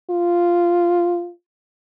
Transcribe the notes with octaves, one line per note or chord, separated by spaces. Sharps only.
F4